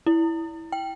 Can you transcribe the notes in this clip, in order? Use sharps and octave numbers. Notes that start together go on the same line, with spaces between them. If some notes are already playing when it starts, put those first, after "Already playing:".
E4
G5